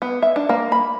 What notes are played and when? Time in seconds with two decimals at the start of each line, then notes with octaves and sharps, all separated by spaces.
0.02 B3
0.22 E5
0.36 D4
0.49 A#3
0.72 B5